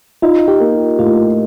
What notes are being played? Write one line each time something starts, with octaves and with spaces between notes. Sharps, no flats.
D#4 F4
G4
A#3
A2 F4